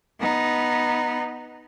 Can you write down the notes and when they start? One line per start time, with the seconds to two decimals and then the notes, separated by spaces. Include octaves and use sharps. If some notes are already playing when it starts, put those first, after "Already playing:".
0.20 B3 D#4